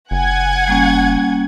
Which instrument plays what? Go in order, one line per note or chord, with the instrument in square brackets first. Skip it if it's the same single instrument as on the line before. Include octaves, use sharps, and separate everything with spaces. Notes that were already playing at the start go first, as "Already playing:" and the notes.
[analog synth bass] F#1 [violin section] F#5 G#5 G#6
[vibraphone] G3 A#3 C#4